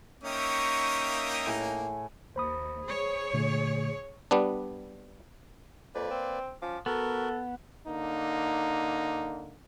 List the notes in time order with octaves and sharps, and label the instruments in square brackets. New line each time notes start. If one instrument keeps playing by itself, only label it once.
[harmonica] A#3 C#4 D#4 [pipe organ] E5 G5 D#6 [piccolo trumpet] C#6
[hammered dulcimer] A2 G#4
[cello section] D#2 [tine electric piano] C5 B5 D#6
[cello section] G#4 C#5
[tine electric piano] A#2 D3 A3
[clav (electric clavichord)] G3 B3 D4
[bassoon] F2 [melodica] A#3 B4 D5
[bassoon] C4
[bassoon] F3 [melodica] C#4 D6
[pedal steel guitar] B3 [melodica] F#4 A#4 [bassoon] A4
[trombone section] D3 A#3 D#4